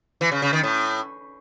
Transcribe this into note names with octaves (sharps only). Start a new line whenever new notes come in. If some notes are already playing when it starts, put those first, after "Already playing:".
E3
C#3
C#3
D#3
A2